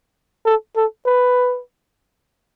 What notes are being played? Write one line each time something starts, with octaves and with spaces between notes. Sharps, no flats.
A4
A4
B4